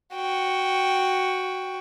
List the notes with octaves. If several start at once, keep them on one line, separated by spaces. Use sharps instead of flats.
F#4 G5